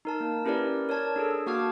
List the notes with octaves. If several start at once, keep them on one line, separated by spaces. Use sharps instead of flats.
D#4 A#4 A5
A#3
C#4 E4 G4 A#4 B4 D5
A#4 C#5 D5 A5 G#6
D4 G#4 A4
A#3 F#4 A5 D6 F6 G#6